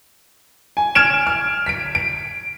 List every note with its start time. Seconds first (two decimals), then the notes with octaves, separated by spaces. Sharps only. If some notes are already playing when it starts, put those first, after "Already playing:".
0.77 G#5
0.95 F6 G#6 D7 E7
1.27 F6
1.66 B6 D7
1.95 D7